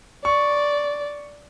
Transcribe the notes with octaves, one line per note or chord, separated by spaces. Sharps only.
D5 C#6